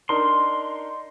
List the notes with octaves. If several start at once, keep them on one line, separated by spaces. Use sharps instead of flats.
D4 D#4 A#4 C6